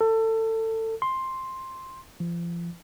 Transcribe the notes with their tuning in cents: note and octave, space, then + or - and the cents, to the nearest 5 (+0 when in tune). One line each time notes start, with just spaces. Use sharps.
A4 +25
C6 +5
F3 -35